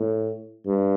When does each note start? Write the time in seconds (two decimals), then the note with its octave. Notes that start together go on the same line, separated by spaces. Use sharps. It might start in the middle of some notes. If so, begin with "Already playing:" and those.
Already playing: A2
0.66 G2